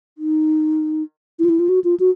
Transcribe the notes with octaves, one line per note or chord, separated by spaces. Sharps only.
D#4
E4
F4
E4
F4
F#4
F4
F#4